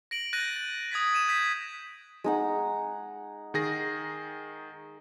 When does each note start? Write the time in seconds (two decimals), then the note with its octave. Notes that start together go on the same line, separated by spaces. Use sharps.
0.11 A#6 D7 F#7
0.33 F#6 G6 A6 A#6 D#7 F#7
0.56 A6
0.92 D#6 G#6 A6 B6
1.13 G#6 D#7 E7
1.28 G6 G#6 B6
2.24 G#3 D#4 F#5
3.54 D#3 G#4 A#6